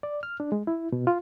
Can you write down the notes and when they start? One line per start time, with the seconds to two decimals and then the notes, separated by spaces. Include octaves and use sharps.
0.03 D5
0.23 F6
0.40 D4
0.52 G#3
0.67 E4
0.92 B2
1.07 F4